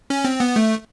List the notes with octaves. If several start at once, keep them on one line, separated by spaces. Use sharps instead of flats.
C#4
C4
B3
A3